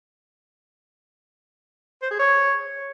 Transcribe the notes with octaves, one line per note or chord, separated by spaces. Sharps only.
C5
G#4
C#5